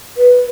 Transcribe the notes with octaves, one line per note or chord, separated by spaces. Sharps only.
B4